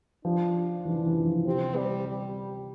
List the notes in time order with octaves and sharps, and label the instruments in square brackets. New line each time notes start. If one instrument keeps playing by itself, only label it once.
[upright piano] F3 [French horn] D4
[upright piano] E3
E3
F3
[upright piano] C3 [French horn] C4
[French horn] G3
G3